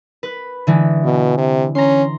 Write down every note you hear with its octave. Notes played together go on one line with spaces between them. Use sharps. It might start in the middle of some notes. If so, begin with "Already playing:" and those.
B4
D3 E3 G#3
B2
C3
C#4 A#5 C6